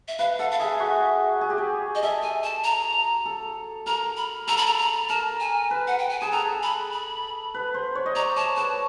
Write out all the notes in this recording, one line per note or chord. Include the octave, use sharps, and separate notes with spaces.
E5
B4 F5
A4 F#5
F5
G#4 E5
F#4
G#4
G4
G#4
D#5
A4 E5
G#5
A5
A#5
A4
A#4 A#5
B5
A4 A#5
B5
A#5
A#5
A#4 A5
G#5
B4
F#5
G5
G#5
G#4 A5
A4 A#5
B5
B5
B4
C5
C#5
D#5
D5 A#5
C#5 A5
B4 A5